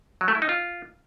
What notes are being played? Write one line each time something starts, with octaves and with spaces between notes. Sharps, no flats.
F#3
A3
E4
D#4
F4